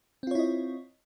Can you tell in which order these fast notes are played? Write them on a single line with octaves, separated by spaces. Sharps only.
C4 F4 C#5 E4 D#5